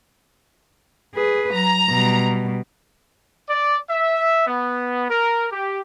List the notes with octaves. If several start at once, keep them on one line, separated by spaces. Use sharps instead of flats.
G#4 B4
F#3 A#5
B2 G3
D5
E5
B3
A#4
G4